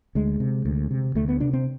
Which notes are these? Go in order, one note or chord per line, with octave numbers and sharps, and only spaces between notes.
D2 G#3
C3
D2
C3
D2 A3
B3
C3 D4
C4